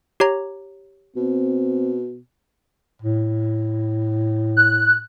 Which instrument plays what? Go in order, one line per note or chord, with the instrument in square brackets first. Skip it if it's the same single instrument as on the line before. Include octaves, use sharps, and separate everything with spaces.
[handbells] G4 C#5 A#5
[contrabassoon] B2 [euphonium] C4
[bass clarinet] A2
[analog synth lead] F#6